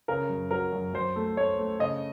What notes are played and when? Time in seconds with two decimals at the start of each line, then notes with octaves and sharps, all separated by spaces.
0.08 C#3 A#4
0.29 F#2
0.51 F#3 A#4
0.72 F#2
0.94 F#2 C5
1.16 A3
1.37 A3 C#5
1.59 A3
1.79 C#3 D#5